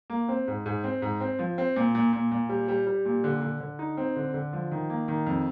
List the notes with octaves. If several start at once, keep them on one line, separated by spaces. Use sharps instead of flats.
A#3
C4
G#2
G#2
C4
G#2
C4
F3
C4
A#2
A#2
A#2
A#2
G3
G3
G3
A#2
D3
D3
D3
D#4
C4
D3
D3
F3
D#3
A#3
D#3
F2